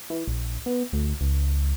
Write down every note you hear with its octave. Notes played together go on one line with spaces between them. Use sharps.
E3
A#1
B3
D2
C#2